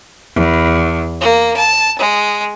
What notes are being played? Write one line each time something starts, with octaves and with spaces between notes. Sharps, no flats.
E2
A#3
A5
G#3